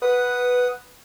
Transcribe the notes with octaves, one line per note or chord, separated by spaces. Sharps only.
B4 F#5 D#6